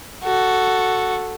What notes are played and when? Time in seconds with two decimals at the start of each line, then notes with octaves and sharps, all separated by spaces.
0.24 F#4 A4